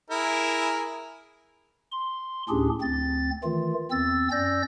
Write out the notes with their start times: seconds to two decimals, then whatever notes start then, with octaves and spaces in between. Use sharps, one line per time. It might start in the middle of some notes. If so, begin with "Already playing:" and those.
0.10 E4 G#4 A#4
1.91 C6
2.49 D2 A2 C#4 D4 G4 G#4
2.81 D2 C4 A6
3.43 D#3 E3 A3 F4
3.91 E2 C4 E6 A6
4.31 F#2 C#4 D5 E6 G6 A#6